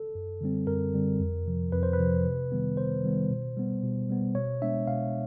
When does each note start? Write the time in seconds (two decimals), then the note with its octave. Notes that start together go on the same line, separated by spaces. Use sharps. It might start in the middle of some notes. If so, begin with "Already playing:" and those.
Already playing: A4
0.15 F#2
0.41 D3 G3 C4
0.67 F#2 A#4
0.94 D3 G3 C4
1.20 F2
1.47 C3 F3
1.72 F2 B4
1.83 C5
1.93 B4
1.99 C3 F3
2.26 C3
2.52 D#3 G3 B3
2.77 C3 C5
3.04 D#3 G3 B3
3.30 B2
3.57 G3 B3
3.83 B2
4.10 G3 B3
4.35 B2 C#5
4.62 G#3 B3 D4 E5
4.87 B2 F5